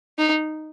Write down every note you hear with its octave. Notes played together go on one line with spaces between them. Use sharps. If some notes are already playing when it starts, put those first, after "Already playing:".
D#4